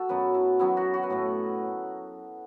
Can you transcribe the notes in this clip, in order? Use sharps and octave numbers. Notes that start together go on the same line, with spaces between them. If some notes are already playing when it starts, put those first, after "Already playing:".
Already playing: F#4 A4
F#2 F#3 B3 B4
E4
F#2 F#3 B3 E4
F#4
F#4
B4
A2 A3 A4